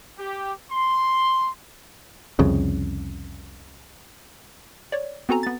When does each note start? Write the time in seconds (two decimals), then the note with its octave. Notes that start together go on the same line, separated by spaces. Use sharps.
0.18 G4
0.71 C6
2.39 C2 F2 C#3
4.92 C#5 D5
5.29 B3 C4 F#4 A4 G#5 A#5
5.43 B3 A6